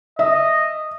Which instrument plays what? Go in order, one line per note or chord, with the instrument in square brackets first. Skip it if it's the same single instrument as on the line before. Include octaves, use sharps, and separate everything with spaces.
[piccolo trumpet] D#5 [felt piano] E5